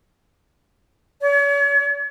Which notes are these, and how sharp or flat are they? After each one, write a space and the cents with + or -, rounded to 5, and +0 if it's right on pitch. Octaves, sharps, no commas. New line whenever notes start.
C#5 +40